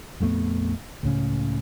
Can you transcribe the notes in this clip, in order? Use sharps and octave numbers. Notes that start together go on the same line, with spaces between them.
A#1 F2 A3 B3
C#2 A2 C#3